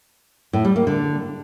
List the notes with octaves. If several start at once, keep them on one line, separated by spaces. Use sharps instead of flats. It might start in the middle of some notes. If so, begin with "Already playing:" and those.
A2
G3
A#3
D3